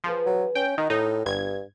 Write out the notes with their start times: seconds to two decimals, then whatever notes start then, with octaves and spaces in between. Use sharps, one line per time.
0.04 E3 F3 G#4 B4
0.26 F#3
0.55 C#4 G5
0.78 D#3 D#4 F#4 G5
0.90 A2 D#4
1.26 G1 G2 G#6